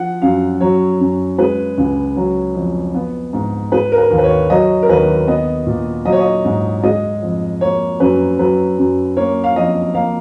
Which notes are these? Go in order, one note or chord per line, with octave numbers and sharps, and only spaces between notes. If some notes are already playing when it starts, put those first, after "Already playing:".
Already playing: F3 F#5
F#2 F5
F#3 C#5
F#2
G#3 B4
C#2
F#3
F2
B3
G#2
G#3 B4
A#4
B4
D#2
B4
C#5
F#3 D#5
A#4
D#2 B4
B3 D#5
A#2
F#3 D#5
C#5
D#5
G#2
G#3 D#5
F2
A#3 C#5
F#2 B4
F#3 B4
F#2
A#3 C#5
F5
F2 D#5
A#3 F5